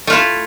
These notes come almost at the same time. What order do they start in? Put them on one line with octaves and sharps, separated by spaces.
A3 F4 E4